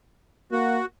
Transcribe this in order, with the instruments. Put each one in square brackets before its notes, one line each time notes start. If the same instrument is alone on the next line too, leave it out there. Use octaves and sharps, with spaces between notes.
[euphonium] A#3 [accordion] F#4